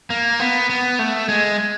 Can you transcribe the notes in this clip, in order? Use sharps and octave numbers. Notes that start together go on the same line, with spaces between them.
A#3
B3
B3
A3
G#3